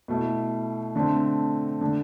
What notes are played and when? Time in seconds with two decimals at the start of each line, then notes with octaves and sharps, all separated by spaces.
0.08 B2 A3 E4
0.96 D3 A3 C4
1.81 D3 A3